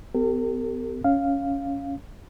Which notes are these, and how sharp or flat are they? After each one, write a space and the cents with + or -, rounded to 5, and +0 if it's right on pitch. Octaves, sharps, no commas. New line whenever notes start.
B3 +30 G4 +0 A#4 -45
C#4 +5 F5 +0